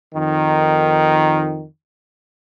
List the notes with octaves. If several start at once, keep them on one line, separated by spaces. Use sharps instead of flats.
F2 D#3